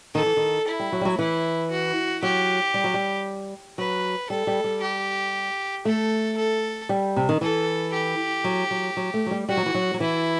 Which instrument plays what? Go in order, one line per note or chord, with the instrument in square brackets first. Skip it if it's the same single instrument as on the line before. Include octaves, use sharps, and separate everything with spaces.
[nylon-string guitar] D#3 [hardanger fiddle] A4
[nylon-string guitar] E3
D#3
[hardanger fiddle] E4
[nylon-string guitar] G3
F#3
G3
F#3
[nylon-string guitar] E3 [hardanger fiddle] E4
[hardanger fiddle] F#4
[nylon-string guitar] F#3 [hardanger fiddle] G4
[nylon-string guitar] G3
F#3
G3
[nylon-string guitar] F#3 [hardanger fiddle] B4
[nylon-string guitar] G3 [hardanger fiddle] A4
[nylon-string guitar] G3
G3
[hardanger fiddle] G4
[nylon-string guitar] A3 [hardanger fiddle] A4
[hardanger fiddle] A4
[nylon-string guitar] G3
C3
D#3
[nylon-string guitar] E3 [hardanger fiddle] A4
[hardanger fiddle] G4
[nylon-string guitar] F#3
F#3
F#3
A3
F#3
G3
[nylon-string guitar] G3 [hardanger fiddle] F#4
[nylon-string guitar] F#3
E3
F#3
F#3
[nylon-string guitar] E3 [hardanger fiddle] E4